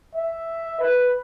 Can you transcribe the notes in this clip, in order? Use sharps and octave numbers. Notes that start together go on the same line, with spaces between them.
E5
B4